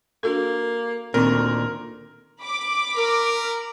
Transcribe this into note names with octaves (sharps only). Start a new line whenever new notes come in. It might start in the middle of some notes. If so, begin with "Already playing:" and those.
A#3 D4 F#4 A4
D2 A#2 D#3 C4 A#4
B5 D6
A#4